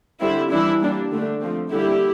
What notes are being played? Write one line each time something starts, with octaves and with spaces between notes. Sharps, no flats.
D3 G3 C4 E4
E3 G3 D4 E4
G3 A#3 D4
D3 A3 D4
F3 A3 C4
D3 G3 A#3 E4 G4